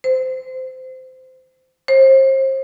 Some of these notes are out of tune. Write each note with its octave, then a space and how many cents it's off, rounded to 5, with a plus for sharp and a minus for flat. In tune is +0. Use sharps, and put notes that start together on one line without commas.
C5 -20
C5 +35